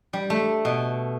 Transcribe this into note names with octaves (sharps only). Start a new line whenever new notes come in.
G3
A3
B2